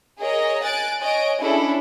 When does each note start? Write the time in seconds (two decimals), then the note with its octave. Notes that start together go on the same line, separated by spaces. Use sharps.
0.19 G#4 A#4 C#5 D#5
0.63 G#5 F#6 A6 D7
1.02 C#5 D#5 G#5 D7
1.41 C#4 D4 E4 G#4 A4